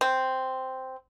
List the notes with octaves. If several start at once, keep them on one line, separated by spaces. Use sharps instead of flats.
C4